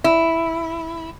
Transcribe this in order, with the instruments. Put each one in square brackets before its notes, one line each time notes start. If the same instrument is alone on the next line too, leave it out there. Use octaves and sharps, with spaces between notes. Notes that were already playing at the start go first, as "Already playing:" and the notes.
[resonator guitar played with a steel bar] E4